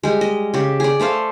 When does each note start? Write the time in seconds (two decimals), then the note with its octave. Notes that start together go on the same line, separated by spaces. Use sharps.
0.03 G3 G#3
0.21 D#5
0.54 C#3 G4
0.80 G#4 D5
1.00 A3 A4 C5 F5